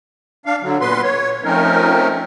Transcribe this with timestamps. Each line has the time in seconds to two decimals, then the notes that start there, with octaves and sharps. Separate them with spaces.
0.46 D4 F5
0.62 D3 F#3
0.81 A#2 B3 B4 C6
1.03 C#5
1.44 F3 A3 C4 C#4 D#4 A#4